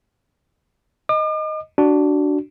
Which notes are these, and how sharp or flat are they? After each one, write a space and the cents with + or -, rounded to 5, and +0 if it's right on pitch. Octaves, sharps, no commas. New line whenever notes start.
D#5 +0 D6 +45
D4 +0 F#4 +15